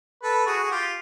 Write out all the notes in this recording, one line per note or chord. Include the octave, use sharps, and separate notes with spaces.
A4 B4
F#4 G#4
F#4
F4 G4